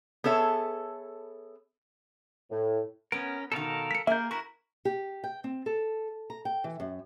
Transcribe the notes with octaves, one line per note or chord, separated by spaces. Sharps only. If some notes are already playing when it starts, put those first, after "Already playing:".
B3 G#4 A4 C#5 E5
A2
B3 C#4 A#4 D7
B2 D#3 A4 A#4 F5
B6 C#7
A#3 G#4 A#4 E5 G6
E4 F#4 A#4 C#6
G4
G5
C4
A4
A#5
G5
E3
F#2